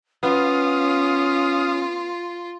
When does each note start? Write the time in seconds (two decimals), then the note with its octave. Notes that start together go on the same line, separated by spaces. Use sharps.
0.23 B3 C#4 F4 F5 D#6